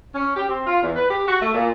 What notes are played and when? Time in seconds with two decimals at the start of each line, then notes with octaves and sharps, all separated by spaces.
0.15 C#4
0.36 G4
0.49 C4
0.66 F4
0.82 E2
0.96 B4
1.10 G4
1.27 F#4
1.42 A3
1.54 A#2